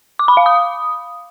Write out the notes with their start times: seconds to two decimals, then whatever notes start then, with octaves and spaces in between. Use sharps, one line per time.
0.19 D6
0.28 B5
0.37 F5
0.46 D#6